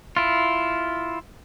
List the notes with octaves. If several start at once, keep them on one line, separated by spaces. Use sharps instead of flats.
E4 F4